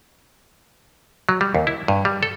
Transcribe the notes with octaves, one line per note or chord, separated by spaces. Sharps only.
F#3
G3
D#2
E4
G2
G3
A4